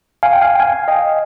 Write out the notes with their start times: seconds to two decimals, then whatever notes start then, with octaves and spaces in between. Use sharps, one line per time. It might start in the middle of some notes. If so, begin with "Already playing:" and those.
0.23 F5 G#5
0.33 G5
0.42 F5 G#5
0.55 G5
0.60 F5 G#5
0.88 D#5 G5